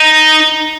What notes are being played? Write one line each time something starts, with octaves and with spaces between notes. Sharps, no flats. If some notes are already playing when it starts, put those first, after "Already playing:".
Already playing: D#4